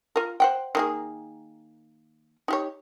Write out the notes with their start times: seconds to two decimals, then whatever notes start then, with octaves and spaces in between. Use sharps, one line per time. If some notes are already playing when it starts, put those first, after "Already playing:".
0.16 F4 A#4
0.40 C5 F#5 G5
0.75 D#3 A#3 G#4
2.48 D#4 G4 C#5